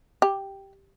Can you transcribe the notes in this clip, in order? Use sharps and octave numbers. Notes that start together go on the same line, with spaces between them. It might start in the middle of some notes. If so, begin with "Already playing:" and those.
G4